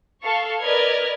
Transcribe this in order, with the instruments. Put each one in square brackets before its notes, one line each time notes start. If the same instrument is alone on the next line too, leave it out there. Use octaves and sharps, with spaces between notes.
[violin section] A4 F5 C#6
A#4 B4 D5 D#5 F6 G#6